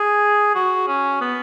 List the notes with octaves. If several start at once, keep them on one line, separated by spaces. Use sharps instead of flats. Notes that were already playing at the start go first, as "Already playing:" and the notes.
Already playing: G#4
F#4
C#4
B3